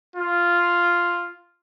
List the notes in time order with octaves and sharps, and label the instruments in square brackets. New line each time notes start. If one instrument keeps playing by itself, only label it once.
[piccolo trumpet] F4